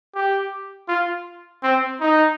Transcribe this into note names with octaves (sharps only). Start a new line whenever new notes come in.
G4
F4
C4
D#4